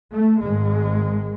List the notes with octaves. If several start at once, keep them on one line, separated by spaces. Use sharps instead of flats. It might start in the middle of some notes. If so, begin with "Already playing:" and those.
A3
G#1 G#2 G#3